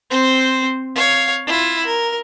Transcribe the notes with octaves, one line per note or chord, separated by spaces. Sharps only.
C4 C5
C#5 F5
E4 F4
A#4